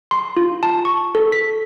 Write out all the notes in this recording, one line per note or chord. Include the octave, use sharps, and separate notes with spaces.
C6
F4
A5
C#6
A4
B6